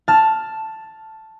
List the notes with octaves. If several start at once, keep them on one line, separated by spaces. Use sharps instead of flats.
A5 F6 A6